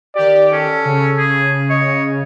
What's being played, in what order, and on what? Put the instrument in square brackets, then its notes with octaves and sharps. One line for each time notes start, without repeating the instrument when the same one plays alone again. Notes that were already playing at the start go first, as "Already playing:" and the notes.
[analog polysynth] D#3 G4 [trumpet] D5
[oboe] C#4 [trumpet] A4
[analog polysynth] C#3
[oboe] G#4
[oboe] C#5 [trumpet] D#5